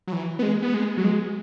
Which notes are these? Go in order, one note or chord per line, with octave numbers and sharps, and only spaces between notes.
F#3
E3
B3
G#3
B3
G#3
F#3
G#3